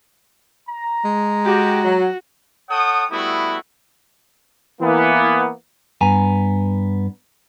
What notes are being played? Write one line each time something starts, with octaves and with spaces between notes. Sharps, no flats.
A#5
G#3
F#4 G4
F#3
A4 C#5 F#5 G5 D#6
G3 A3 B3 E4 F#4 D#6
E3 A#3 B3
G2 B3 G#5 A#5